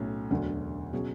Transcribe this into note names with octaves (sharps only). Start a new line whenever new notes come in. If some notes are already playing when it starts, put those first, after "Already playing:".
Already playing: B1 A2 F#3 A3 C#4
E1 D2 D3 F#3
B2 F#3 C#4 G#4 C#5